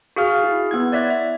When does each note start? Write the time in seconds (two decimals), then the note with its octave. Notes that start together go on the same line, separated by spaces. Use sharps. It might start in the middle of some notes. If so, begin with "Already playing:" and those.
0.16 F#4 G#4 F5 F6
0.43 E4 G#4
0.71 B3 E4 G#6
0.92 C#5 D5 E5 F#6 G#6
1.10 D5 E5